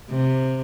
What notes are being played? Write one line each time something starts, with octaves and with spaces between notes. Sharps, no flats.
C3